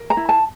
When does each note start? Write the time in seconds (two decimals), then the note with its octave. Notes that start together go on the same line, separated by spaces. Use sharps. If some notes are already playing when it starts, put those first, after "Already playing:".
Already playing: A#4
0.10 A#5
0.17 E4
0.29 A5